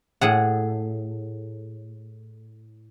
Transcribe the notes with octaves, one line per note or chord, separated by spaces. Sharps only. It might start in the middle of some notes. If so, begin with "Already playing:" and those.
A2 G#4 F#5